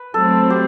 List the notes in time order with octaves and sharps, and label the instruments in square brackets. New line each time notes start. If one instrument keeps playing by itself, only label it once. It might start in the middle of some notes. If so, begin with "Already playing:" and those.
Already playing: [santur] B4
[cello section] F#3 A3 C4 [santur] A4
[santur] G4